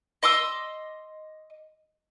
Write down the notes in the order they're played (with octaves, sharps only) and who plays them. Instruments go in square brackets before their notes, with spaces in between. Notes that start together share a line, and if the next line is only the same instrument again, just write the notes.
[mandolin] D#5 C6 D6 E6